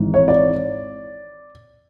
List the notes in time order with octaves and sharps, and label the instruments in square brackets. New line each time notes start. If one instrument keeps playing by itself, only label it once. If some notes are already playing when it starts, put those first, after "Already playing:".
Already playing: [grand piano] G#1 G#2 E3
C#5
D5